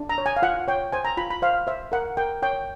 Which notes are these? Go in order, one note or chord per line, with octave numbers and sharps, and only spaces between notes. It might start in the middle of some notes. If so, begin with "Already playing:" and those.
Already playing: D4
A#5
C#5
G#5
F5
F4 F#5
C#5 G5
C5 G#5
A#5
F4 B5
B5
C5 F5
C5 E5
A#4 F#5
A#4 G5
C#5 G5